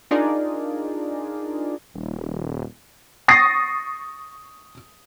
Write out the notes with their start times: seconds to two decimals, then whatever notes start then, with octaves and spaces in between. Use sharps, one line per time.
0.11 D4 D#4 F4 G#4 A#4 D5
1.94 D#1
3.28 C#6 D#6 A6 A#6 C7